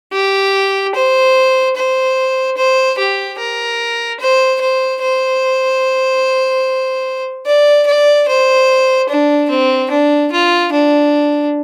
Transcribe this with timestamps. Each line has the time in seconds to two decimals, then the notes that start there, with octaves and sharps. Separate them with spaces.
0.13 G4
0.95 C5
1.76 C5
2.57 C5
2.99 G4
3.39 A#4
4.20 C5
4.61 C5
5.02 C5
7.46 D5
7.87 D5
8.28 C5
9.09 D4
9.50 C4
9.90 D4
10.31 F4
10.73 D4